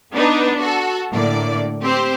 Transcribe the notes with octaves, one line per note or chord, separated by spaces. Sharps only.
B3 D4 D#4 B4
F#4 A4
A2 D3 A#3 D5
C4 G4 C5